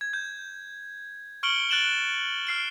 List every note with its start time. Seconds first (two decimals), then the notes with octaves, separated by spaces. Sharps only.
0.01 G#6
0.13 G6
1.43 C#6 F6 C#7 D7 F#7 G7
1.69 F#6 A6 D7 E7 F#7 G7
2.47 F6 C7 D7